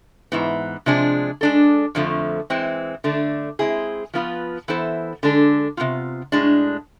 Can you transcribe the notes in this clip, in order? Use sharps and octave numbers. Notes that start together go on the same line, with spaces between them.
G#2 E3 B3
C3 F3 G#3 D4 G#4
G#3 D4 A4
F2 D3 F3 A3
E3 G#3 C4
D3 A3 D4
G#3 C4 E4 G#4
F3 B3 F4 B4
E3 B3 E4 A4 C5
D3 G#3 D4 A4
C3 E3 B3 F4
A2 G#3 D4